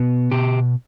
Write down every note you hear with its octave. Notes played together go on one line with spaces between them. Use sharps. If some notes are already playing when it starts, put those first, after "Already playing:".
Already playing: B2 B3
B2 G4